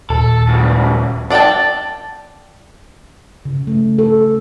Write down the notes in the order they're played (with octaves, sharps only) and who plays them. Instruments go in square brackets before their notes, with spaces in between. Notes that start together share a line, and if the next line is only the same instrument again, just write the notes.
[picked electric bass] D#1 [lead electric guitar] A4
[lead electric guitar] C#2 F#2
[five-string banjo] D4 D5 F#5 G5 A5
[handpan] C#3
A3
A4